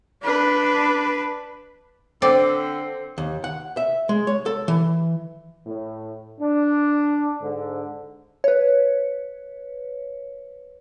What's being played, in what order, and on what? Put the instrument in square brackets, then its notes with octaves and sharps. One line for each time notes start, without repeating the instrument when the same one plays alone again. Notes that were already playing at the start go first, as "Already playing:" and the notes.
[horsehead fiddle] D4 B4
[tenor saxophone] D3 [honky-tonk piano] C4 [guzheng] D5
[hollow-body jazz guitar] D#2
F#5
E5
G#3
C#5
A4
E3
[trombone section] A2
D4
G#2 D3
[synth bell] B4 C#5